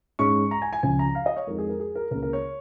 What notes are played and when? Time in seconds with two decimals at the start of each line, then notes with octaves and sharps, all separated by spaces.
0.19 G#2 G#3 C#4 C#6
0.51 A#5
0.62 G#5
0.73 G#5
0.83 C#2 C#3 F3 C#4 G#5
0.99 A#5
1.15 F5
1.26 D#5
1.37 C#5
1.47 F2 F3 G#3 D#4 A#4
1.58 G#4
1.69 A#4
1.80 G#4
1.95 A#4
2.11 C#2 A#4
2.14 C#3 A#3
2.23 A#4
2.33 C#5